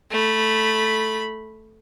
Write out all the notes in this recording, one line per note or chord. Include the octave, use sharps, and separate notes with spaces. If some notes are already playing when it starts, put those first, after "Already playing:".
A3 B5